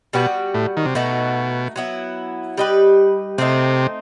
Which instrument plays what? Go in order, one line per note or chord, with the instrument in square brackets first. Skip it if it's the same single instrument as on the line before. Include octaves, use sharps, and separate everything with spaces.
[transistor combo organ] B2 [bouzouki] G3 B3 F#4
[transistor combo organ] A2
D#3
C3
[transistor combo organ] B2 [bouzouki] A3 D#4 F#4
[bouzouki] F#3 B3 E4
G3 D#4 G4 B4
[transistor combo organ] C3 [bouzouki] A3 C4 D#4